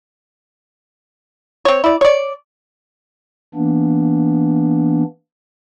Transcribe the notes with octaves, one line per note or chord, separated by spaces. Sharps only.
C4 C#5
E4 D5
C#5 D5
E3 A#3 B3 D4